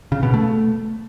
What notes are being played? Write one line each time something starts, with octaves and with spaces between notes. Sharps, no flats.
C#3
B2
A3